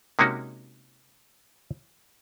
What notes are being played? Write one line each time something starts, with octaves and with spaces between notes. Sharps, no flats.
C3 G#3 A#3 C#4 D#4 F#4